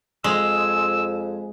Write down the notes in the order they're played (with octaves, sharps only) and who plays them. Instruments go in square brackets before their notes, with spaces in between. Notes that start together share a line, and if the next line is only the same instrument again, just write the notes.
[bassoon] F2 [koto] G#3 [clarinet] E6